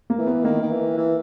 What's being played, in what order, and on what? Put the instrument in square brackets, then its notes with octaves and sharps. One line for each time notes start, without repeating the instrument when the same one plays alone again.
[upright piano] A#3
[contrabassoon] E3
[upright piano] B3
[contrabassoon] D#3 [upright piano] A#3
[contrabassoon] D#3
E3
E3